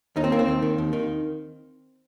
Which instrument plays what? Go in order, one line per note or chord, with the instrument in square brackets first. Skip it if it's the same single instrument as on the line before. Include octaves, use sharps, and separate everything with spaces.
[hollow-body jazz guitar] D#2 D#4
C4
D#3 A#3
C4
D#2
D#3
D#2
D#3